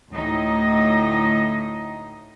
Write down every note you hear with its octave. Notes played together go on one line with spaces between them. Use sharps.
D2 A2 D#4 D#5